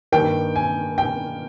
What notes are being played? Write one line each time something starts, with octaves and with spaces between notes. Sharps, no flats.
G2 D#3 A#3 G5
G#5
G5